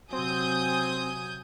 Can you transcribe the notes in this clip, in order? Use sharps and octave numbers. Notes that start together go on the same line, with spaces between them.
C3 F#3 C4 G#5 D#6 G6